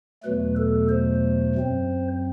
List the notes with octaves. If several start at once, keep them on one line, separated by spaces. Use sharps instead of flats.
E2 B2 F#3 A3 B4
A4
C5
F#2 F#3 C4